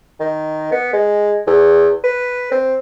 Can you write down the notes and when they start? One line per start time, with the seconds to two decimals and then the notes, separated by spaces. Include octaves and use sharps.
0.20 D#3
0.72 B3
0.93 G#3
1.47 E2
2.03 B4
2.51 C4